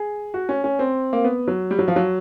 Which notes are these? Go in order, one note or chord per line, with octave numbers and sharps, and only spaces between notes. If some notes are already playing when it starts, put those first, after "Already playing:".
Already playing: G#4
F#4
C#4
C#4
C4
A#3
B3
F#3
G3
F#3
F3
F#3